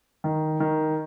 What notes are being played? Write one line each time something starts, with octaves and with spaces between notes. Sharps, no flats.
D#3
D#3